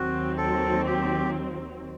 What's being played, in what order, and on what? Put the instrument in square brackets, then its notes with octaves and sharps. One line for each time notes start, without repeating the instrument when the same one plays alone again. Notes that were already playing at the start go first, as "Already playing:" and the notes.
Already playing: [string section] D#2 D#3 F#3 C4 [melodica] F#4
[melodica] A4
G4